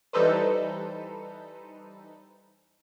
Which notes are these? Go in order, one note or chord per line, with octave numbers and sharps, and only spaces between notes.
E3 G3 D#4 A4 B4 C5